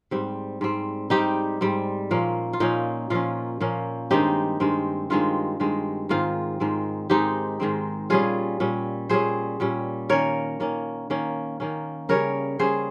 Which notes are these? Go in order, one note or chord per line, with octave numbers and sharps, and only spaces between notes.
G#2 G3 C4
G#2 G3 C4
G#2 G3 C4 D#4 G4
G#2 G3 C4
A#2 F3 A#3 C#4
F4
A#2 F3 A#3 C#4 D#4
A#2 F3 A#3 C#4 F4
A#2 F3 A#3 C#4
G2 D#3 G#3 C4 D#4 G4
G2 D#3 G#3 C4
G2 D#3 G#3 C4 F4
G2 D#3 G#3 C4
G#2 D#3 G#3 C4 F4
G#2 D#3 G#3 C4
G#2 D#3 G#3 C4 D#4 G4
G#2 D#3 G#3 C4
A#2 G3 C#4 F4 G#4
A#2 G3 C#4
A#2 G3 C#4 G#4 C5
A#2 G3 C#4
D#3 A#3 C#4 A#4 C#5
D#3 A#3 C#4
D#3 A#3 C#4
D#3 A#3 C#4
C#3 G3 C#4 A#4 C#5
C#3 G3 C#4 G#4 C5